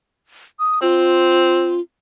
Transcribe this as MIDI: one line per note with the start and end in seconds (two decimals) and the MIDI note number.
0.59 0.79 87
0.82 1.78 60
0.82 1.81 65